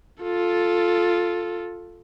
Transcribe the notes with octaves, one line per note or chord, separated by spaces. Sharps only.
F4 A4